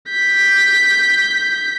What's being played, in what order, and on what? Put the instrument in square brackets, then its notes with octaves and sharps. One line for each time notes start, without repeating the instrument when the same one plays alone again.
[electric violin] G6 B6